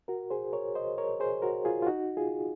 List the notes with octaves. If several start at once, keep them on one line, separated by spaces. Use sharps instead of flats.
F#4 A#4
G#4 C5
A#4 C#5
C5 D#5
A#4 C#5
G#4 C5
F#4 A#4
F4 G#4
F4
D#4 F#4
F4 G#4